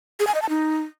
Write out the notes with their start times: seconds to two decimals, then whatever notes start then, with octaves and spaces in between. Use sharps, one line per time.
0.20 G#4
0.27 G#5
0.35 D#5
0.42 A5
0.49 D#4